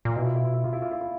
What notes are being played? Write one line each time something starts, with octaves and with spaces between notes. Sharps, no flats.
A#2
B2 E4
F4
E4
F4
E4
F4
E4
F4
E4
F4